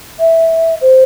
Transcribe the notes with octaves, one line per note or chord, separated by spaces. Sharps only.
E5
C5